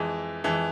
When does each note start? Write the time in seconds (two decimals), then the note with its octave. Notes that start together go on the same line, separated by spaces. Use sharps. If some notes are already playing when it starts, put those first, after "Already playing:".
Already playing: F2 E3 G#3
0.44 F2 E3 G#3